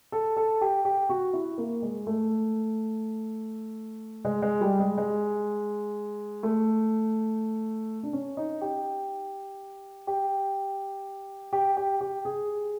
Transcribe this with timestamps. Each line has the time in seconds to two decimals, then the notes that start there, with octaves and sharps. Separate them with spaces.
0.12 A4
0.37 A4
0.61 G4
0.85 G4
1.09 F#4
1.33 E4
1.58 A#3
1.82 G#3
2.07 A3
4.25 G#3
4.42 G#3
4.61 G3
4.79 G#3
4.98 G#3
6.43 A3
8.03 D4
8.13 C#4
8.37 D#4
8.61 G4
10.07 G4
11.53 G4
11.77 G4
12.01 G4
12.25 G#4